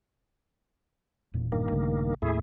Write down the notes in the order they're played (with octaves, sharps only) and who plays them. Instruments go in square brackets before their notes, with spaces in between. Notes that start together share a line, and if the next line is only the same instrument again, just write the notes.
[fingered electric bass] E1 E2 A#2
[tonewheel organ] G2 D#3 A#3
[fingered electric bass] A#1 C#3 A3
[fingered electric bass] D#2 A2 A#3 [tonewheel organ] A3 E4 G#4